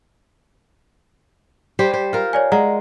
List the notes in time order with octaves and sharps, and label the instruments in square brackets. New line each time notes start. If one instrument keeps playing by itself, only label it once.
[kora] G3 G4 C5
C5
F4 A#4
[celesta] C#5 D5 G#5
[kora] G#3 [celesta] D5 F#5 A#5